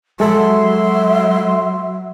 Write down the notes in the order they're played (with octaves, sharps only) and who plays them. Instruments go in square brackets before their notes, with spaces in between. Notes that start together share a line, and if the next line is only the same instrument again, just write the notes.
[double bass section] F#3 [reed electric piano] G#3 A4 [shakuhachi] E5 [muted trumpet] C6